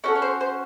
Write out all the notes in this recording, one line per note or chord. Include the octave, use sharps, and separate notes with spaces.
C#4 F#4 A4 B4
C#5
C5
C5